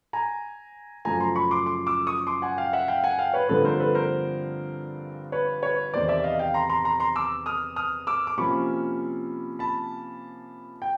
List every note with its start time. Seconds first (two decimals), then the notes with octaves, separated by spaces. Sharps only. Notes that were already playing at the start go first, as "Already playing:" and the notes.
0.13 G#5 A#5
1.05 F#2 C#3 F3 A3 G#5 A#5
1.20 A#5 C6
1.36 B5 C#6
1.51 C6 D6
1.66 C6 D6
1.87 D6 E6
2.07 C#6 D#6
2.27 C6 D6
2.42 F#5 G#5
2.57 F5 G5
2.73 E5 F#5
2.88 F5 G5
3.04 F#5 G#5
3.19 F5 G5
3.34 B4 C#5
3.49 G2 D3 F3 A3 C4 A4 B4
3.64 A#4 C5
3.80 A4 B4
3.95 A#4 C5
5.32 B4 C#5
5.63 B4 C#5
5.93 E2 C3 D#3 C5 D5
6.09 D5 E5
6.24 D#5 F5
6.39 F5 G5
6.54 A#5 C6
6.70 A#5 C6
6.85 A#5 C6
7.00 A#5 C6
7.16 D6 E6
7.46 D#6 F6
7.76 D#6 F6
8.07 D6 E6
8.27 D6
8.38 C3 F3 A#3 C#4 B5 C#6
9.59 A5 B5
10.82 G5